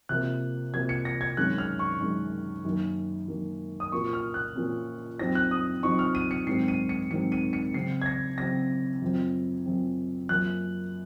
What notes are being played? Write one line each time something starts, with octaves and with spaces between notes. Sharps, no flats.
C3 F3 A#3 F#6
C3 F3 A#3 G#6
C#7
A#6
G#6
F#2 D#3 G#3 C#4 F#6
F6
C#6
F#2 D#3 G#3 C#4
F#2 D#3 A#3
F#2 D#3 A#3
D#6
A#2 F3 A#3 C#4 C#6
F6
F#6
A#2 F3 A#3 C#4
F#2 F3 C4 D#4 A#6
F#6
D#6
F#2 F3 C4 D#4 C#6
F6
D#7
C#7
G#2 D#3 F#3 C4 C7
D#7
C#7
G#2 D#3 F#3 C4 C#7
D#7
C#7
C#3 F#3 C4 C7
G#6
A#6
C#3 F#3 C4 A#6
F#2 F3 C4
F#2 F3 C4
F#2 F3 A#3 F#6